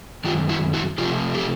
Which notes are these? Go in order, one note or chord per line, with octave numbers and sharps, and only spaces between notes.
F#2 D#3 G#3 F4 G4
E4 F#4
E4 F#4
C3 F3 A3 F4 G4
G4 A4